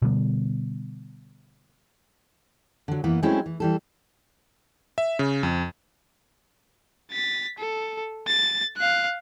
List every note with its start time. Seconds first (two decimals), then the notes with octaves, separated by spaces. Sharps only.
0.02 B2 D3 G3 B3
2.88 D3 F#3
3.04 F#2 E3 A#3 B3
3.22 F#3 G#3 A3 C4 C#4 E4
3.46 E3
3.60 E3 G3 A4
4.98 E5
5.19 C#3
5.43 F2
7.12 A6 B6
7.58 A4
8.27 A6
8.77 F5 F#6